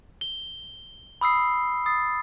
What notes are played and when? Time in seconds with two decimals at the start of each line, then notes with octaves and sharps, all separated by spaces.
0.21 G7
1.21 B5 D#6 E6 C7
1.86 D#6 A6 C7